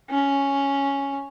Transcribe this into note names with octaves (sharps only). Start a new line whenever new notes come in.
C#4